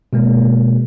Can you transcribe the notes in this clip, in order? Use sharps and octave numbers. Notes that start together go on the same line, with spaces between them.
B2 G#3 A#3